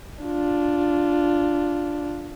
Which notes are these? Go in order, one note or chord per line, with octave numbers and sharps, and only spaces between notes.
D4 F4